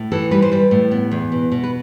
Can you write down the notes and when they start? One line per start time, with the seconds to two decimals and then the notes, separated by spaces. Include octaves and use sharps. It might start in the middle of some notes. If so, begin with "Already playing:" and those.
Already playing: A2
0.12 E3 A4
0.31 G3 B4
0.42 C5
0.52 G3 B4
0.71 A2
0.91 B3
1.11 E2
1.32 B2
1.52 B2
1.64 B4